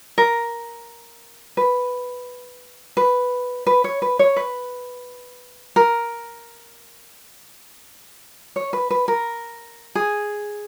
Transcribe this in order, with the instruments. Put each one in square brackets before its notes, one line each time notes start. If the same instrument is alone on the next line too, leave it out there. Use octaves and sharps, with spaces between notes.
[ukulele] A#4
B4
B4
B4
C#5
B4
C#5
B4
A#4
C#5
B4
B4
A#4
G#4